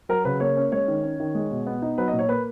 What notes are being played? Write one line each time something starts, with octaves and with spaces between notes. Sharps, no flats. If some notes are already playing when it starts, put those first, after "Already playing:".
F#3 A#4
C#3 B4
A#3 C#5
C#4
G#3 C#5
D#3
C#4
D#3
G#3
B2
B3
D#4
F#3 B4
D#5
A#2
C#5
A#3 B4